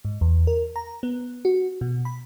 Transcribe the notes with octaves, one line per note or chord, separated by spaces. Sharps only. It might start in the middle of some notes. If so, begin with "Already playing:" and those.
G#2
E2
A#4
A#5
B3
F#4
B2
B5